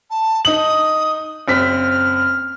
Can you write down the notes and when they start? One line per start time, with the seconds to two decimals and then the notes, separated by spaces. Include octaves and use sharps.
0.10 A5
0.45 D#4 D#6 F#7
1.48 F#1 C4 F6 B6